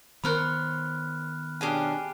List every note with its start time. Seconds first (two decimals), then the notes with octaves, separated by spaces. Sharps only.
0.24 D#3 B3 A#4 C5 C#5 B5 F6 F#6
1.61 B2 C#4 D4 G4 G#4 G#5